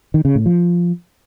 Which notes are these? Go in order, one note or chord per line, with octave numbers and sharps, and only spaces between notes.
D#3
C#3
A2
F3